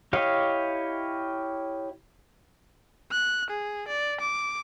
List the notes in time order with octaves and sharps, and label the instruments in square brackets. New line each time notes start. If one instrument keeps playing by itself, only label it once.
[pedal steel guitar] E4 G4 C#5 D#5 F5
[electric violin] F#6
G#4
D5
D6